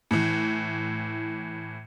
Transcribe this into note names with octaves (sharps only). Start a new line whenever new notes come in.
A2 E3